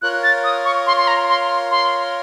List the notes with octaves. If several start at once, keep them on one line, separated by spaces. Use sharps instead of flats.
F4 A#4 C#5 F#6
A6
D#6
C#6
C6
C6
A#5
C6
C6